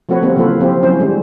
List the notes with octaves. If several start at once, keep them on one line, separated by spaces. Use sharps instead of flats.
F3 A3 C4 F#4 B4 C#5
D#3 G3 A#3 C4
C#3 E3 F#3 F4 A4 B4
F3 C4 F4 G4
F#3 C4 C#4 E4 C5
D3 G3 G#3